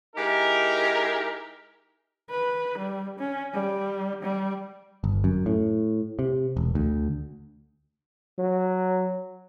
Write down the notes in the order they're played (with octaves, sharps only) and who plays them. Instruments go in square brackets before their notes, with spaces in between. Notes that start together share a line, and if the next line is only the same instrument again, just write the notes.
[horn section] G#3 D#4 E4 G4 A#4
[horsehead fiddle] B4
G3
C#4
G3
G3
[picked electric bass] G1
F#2
A2
C3
E1
D2
[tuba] F#3